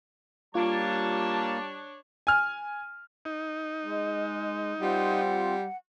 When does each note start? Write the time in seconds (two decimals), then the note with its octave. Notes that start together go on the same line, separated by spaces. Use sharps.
0.55 G3 A#3 D4 F4 C#5 A5
2.27 G#5 F6
3.25 D#4
3.83 G#3
4.81 G3 C4 F4 F#5